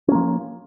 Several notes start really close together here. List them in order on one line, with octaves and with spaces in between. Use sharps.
C#4 A#3 F3